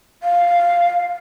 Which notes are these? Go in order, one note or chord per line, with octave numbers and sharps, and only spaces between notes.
F5